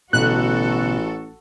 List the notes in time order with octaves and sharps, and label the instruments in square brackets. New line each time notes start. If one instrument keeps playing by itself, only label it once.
[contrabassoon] A1 [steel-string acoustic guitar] B2 D3 [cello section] F#4 A4 [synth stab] F#6